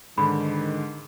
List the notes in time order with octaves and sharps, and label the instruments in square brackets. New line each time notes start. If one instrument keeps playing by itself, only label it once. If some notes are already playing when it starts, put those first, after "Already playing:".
[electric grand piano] G#2 D3 [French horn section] D#3 [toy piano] B5